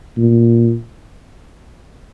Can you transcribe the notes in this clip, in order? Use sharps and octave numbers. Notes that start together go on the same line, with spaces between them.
A#2